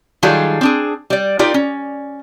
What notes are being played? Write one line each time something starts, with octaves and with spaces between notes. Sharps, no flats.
D#3 F#3 G3 F4 G#4 A4
C4 D4 G#4
G3 D5
D#4 F4 G4 A#4 D5
C#4